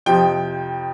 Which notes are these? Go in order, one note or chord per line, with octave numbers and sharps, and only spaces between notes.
F2 C3 F3 G5